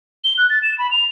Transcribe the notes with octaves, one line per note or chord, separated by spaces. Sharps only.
G7
F#6
A6
E7
B5
F7